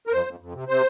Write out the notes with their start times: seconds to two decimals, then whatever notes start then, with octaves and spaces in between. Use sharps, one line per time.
0.07 A#4
0.12 F2 C5
0.26 F2
0.40 F2
0.54 C3
0.68 C3 C5